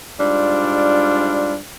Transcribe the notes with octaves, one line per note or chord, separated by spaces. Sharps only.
G#2 G3 D4 F4